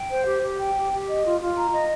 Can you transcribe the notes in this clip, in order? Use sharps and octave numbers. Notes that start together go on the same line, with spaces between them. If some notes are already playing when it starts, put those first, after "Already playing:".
Already playing: G5
C5
G4
G4
G5
G4
G4
D#5
F4
F4
A#5
D#5